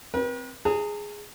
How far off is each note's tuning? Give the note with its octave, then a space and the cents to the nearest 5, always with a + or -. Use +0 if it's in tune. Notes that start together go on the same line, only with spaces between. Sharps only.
C4 +0 B4 -40
G#4 +0 A#5 -45